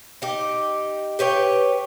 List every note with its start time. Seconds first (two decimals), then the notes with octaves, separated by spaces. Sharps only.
0.22 D#4 G4
1.19 G4 B4 C#5 G5